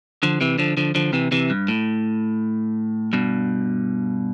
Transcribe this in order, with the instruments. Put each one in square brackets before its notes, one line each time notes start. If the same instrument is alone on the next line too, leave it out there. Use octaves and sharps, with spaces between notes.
[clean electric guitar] D3 F3
C3 E3
D3 F3
D3 F3
D3 F3
C3 E3
C3 E3
G2
A2
G2 B2